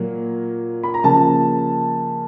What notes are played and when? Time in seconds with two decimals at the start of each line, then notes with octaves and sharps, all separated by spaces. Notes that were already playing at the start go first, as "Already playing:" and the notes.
Already playing: A#2 F#3 A#3
0.83 B5
0.94 A#5
1.04 C#3 F3 A#3 A5